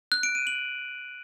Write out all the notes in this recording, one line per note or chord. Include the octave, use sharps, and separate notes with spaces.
F#6
D7
D#7
F#7